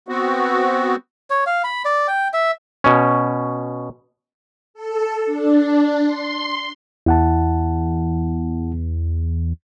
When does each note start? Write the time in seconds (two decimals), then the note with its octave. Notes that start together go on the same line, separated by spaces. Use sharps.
0.08 B3 C4 F#4
1.30 C#5
1.47 F5
1.64 B5
1.85 D5
2.08 G5
2.33 E5
2.84 B2 C#4
4.74 A4
5.26 D4
6.02 C6
7.06 E2 E4 F#5 A5